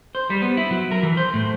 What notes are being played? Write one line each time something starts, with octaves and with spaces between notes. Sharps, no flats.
C5
G3
B3
E4
F#3
A#4
E3
C5
A2